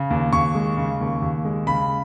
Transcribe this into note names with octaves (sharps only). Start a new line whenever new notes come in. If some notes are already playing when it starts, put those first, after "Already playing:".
Already playing: C#3
D#2
D#2 C#6
G#3
C#3
D#2
D#2
G#3
C#3 B5